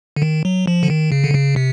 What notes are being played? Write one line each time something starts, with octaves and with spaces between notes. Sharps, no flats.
D3
D#3
F#3
F3
D3
D#3
C#3
D3
C#3
C3